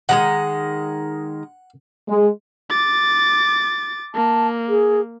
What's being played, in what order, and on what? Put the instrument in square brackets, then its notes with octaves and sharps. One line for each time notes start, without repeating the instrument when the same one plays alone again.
[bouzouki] D#3 G3 G#3 [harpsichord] F#5
[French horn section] G#3
[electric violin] D6 A6
[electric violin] A#3 [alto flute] A5
[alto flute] G#4